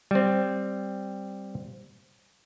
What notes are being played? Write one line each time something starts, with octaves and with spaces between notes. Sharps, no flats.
G3 C4